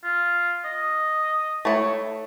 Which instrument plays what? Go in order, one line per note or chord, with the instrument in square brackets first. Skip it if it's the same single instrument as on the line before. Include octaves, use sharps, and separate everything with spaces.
[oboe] F4
D#5
[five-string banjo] A3 E4 C#5